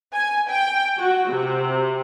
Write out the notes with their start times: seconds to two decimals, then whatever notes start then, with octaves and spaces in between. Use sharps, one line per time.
0.13 G#5
0.49 G5
0.99 F#4
1.30 C3